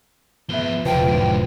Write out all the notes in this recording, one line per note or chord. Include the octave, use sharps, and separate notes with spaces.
F3 B3 E5 G7
E1 C#2 F3 F4 B4 G5
G#2 D3